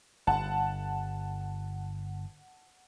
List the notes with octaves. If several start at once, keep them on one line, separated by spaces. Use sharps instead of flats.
G1 F#5 A5